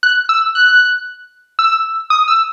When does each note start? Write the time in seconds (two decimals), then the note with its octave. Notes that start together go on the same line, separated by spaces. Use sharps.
0.03 F#6
0.29 E6
0.55 F#6
1.59 E6
2.10 D#6
2.28 E6